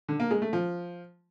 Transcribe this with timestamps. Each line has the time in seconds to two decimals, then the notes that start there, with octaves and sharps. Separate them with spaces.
0.09 D3
0.20 A#3
0.31 G#3
0.42 A3
0.53 F3